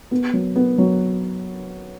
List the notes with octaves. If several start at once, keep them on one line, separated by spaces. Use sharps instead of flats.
B3
F#3
B3
F#3